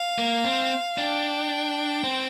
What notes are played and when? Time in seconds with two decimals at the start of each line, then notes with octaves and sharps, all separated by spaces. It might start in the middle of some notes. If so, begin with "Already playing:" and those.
Already playing: F5
0.18 A#3
0.45 C4
0.98 D4 G5
2.04 C4